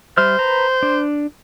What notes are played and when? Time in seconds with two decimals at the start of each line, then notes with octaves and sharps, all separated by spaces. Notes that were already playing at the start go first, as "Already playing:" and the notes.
0.18 G3 C5 E5 F6
0.39 B4 A#5
0.83 D4